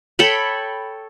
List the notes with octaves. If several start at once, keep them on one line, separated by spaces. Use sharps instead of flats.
A4 C#5 G5 B5